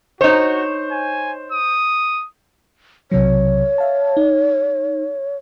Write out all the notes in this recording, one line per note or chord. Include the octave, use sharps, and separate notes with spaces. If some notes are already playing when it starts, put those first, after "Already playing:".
D#4 F#4 C5 C#5
G#5
D#6
B1 C3 F#3 C#5
E5 F5 A5
D#4